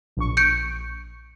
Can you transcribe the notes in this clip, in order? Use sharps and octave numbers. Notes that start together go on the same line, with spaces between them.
A#1 C#6
G6 C#7 D7